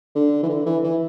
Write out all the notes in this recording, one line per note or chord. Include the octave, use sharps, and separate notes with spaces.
D3
E3
D3
E3
E3